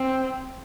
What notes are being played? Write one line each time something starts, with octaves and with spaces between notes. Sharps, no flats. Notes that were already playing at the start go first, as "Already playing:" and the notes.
Already playing: C4